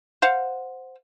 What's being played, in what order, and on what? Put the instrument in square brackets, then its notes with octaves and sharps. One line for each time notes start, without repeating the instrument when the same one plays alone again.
[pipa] C5 F5 F#5